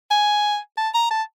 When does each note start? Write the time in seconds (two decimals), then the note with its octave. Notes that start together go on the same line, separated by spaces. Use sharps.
0.11 G#5
0.78 A5
0.94 A#5
1.11 A5